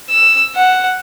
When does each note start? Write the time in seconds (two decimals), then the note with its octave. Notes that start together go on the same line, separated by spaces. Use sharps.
0.10 E6
0.55 F#5